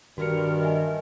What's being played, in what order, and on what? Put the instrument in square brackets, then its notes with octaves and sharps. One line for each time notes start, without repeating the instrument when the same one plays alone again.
[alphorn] G2 [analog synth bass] D#3 [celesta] F#4 C#7 [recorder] A#4
[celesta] D#5 E5 G#5